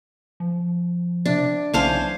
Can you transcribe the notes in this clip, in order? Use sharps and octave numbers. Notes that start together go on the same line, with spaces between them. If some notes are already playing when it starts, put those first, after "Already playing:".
F3
C3 D4
B1 E2 C#4 C5 F5 G#5 A5